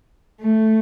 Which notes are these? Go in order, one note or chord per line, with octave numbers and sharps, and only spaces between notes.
A3